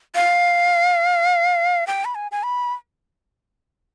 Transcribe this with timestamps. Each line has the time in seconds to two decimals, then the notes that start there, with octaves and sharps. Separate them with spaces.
0.15 F5
1.87 G5
2.05 B5
2.15 G#5
2.32 G#5
2.43 B5